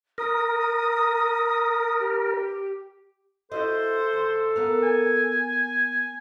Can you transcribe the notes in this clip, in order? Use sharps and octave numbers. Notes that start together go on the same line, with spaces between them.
A#4 D#6
G4
E4 F#4 A4 C5 D#5
E2
A#3 B3 A#4
G#5